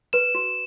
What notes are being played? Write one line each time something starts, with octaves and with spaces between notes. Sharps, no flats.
B4 E7
F#4